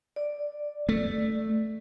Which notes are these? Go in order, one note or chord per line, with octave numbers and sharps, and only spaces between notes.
D5
A3